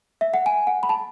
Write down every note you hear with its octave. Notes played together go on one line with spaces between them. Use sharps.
E5
F#5
G#5
F#5
B5
A5